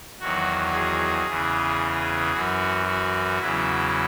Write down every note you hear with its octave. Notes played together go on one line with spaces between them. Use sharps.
E2 D#3 F#3 F#4
G#4
E2 C#3 E3
F#2 E3 F#4
F#4
E2 C#3 F#3 E4